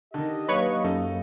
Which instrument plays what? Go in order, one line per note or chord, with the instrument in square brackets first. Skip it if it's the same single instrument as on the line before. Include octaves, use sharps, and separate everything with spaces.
[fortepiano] D3 D#3 [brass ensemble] G4 D#5
[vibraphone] F#3 A#3 F5 [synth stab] B4 C#5 C#6
[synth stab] F#2 [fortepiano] D#4 A4